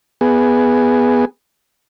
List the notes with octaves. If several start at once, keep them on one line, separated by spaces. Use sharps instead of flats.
B3 G#4